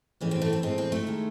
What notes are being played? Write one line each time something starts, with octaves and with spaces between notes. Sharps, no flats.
A2 E3 G#3 C#4
C4
A3
C4
A2 E3 G#3 C4
C4
A3
D#3 G#3